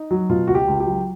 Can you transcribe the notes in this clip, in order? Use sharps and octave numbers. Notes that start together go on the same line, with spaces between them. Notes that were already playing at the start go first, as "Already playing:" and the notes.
Already playing: D#4
F#3
B2 F4
C#2 F#4
G4
C#2
G4
F#3